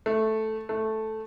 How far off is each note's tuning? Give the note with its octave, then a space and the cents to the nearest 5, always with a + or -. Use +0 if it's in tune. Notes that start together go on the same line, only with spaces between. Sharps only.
A3 -5
A3 -5